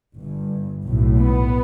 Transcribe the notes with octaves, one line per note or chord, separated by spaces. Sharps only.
G1 G2
B1 A2
B3